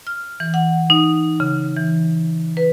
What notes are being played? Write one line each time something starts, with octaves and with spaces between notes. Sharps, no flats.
F6
E3
F#5
D#4
C#3
E3
B4